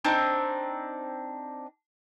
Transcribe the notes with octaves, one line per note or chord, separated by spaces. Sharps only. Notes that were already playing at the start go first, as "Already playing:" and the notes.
C4 D4 D#4